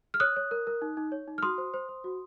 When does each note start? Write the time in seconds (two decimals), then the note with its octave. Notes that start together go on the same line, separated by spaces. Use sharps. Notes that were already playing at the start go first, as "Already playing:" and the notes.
0.14 F6
0.20 C#5 D#6 F#6
0.36 C#5
0.51 A#4
0.67 A#4
0.82 D#4
0.97 D#4
1.12 C#5
1.28 D#4
1.38 F6
1.43 F#4 C6 D#6
1.58 C5
1.74 C5
1.89 C5
2.04 F#4